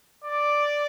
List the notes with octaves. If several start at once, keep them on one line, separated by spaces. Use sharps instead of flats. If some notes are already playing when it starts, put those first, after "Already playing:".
D5